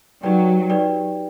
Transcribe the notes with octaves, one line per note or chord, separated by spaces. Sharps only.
F#3 D#4 G4 B4 D5 G5
D#4 G4 B4 D5 G5